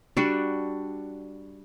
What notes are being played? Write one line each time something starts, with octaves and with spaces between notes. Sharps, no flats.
G3 D4 F#4 A4